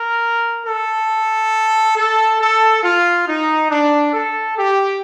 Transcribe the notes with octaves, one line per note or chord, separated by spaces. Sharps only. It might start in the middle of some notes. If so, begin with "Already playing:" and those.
Already playing: A#4
A4
A4
A4
F4
D#4
D4
A4
G4